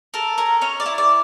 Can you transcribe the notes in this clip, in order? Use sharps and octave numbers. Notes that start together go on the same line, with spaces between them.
A4 A#4
C#4 A#4
C#4 C#5
D5
E4
D5